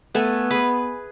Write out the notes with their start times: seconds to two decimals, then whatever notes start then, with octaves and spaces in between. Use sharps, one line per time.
0.15 A3 B3 A4 G#5
0.50 G#4 B4